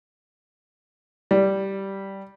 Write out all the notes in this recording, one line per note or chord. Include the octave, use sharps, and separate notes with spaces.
G3